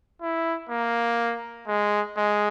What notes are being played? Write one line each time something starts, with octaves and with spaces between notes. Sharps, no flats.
E4
A#3
G#3
G#3